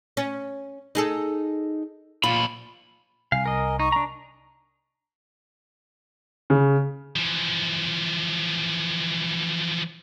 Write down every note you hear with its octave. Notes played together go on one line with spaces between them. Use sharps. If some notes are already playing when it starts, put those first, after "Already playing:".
C#4
D#4 G#4 A4
A#2 F4 B5
C2 F5 G#5
A#4 D#5
D#4 C#6
D4 A#5
C#3
E3 F3